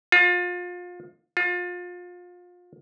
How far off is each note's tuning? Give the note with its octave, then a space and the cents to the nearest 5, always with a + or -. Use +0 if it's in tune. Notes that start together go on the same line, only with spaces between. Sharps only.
F4 +30
F4 +30